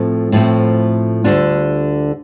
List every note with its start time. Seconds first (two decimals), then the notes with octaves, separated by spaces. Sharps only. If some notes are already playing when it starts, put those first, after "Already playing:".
Already playing: A2 F3 A3 C4
0.32 A2 F3 A3 C4
1.24 D2 D3 G3 D4 F4